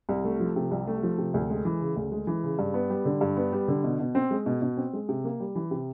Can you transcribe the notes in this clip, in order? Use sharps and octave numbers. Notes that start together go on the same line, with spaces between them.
C2
A3
F3
C3
C2
A3
F3
C3
D2
G#3
E3
C#3
D2
G#3
E3
C#3
G2
B3
G3
D3
G2
B3
G3
D3
B2
B2
C4
G#3
B2
B2
C4
G#3
C3
A#3
G3
E3
C3